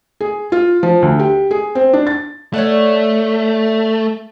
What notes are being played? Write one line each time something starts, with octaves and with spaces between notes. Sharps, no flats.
G#4
F4
F3
D2
G4
G#4
C4
D4
A6
A3 C#5 D5 F#5